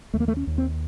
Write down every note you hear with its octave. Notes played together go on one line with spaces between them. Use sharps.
D#2 A3
A#3
A3
C#4
D#2
C4